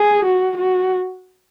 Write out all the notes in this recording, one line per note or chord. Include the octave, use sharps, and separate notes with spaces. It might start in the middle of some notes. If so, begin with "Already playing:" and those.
Already playing: G#4
F#4
F#4